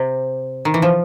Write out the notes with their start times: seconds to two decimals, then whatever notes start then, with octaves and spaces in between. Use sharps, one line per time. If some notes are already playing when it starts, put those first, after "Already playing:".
Already playing: C3
0.65 D#3
0.74 E3
0.82 F3